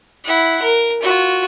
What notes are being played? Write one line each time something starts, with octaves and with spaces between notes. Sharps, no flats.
E4 F#5
A#4
F4 F#4